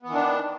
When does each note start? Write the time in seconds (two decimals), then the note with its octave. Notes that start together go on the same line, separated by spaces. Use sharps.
0.02 B3
0.06 E3
0.10 D#3
0.14 D4